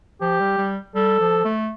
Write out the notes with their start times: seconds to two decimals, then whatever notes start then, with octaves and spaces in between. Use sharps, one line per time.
0.21 F3 G4
0.40 G3
0.58 G3
0.95 G3 A4
1.20 F3
1.45 A3